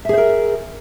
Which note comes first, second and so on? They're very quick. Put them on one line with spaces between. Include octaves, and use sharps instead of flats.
E5 G#4 C5 A#4